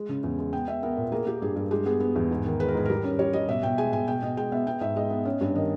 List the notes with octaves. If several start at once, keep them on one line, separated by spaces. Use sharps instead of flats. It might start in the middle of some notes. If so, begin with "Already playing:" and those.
Already playing: G#3
C#3
E2
G#3
B3 G5
B3 E5
B3 A#4
A#2
A#3 G#4
A#3 G4
G2 G#4
G2
G#3 G4
B3 G#4
B3
E2
G#2
D#3
G#3 B4
A#4
G#2 G#4
G3 A#4
C#4
G3 C#5
G3 D#5
B2 E5
B2 G5
G#3 G#5
B2 G#5
B2 G5
B2 D#5
G#3 G5
B3 E5
B3 G5
G#2 E5
G#3 D#5
B3
C#4
G2
D#3 D#5